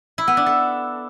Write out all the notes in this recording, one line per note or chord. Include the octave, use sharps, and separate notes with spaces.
E4
B3
D4
A4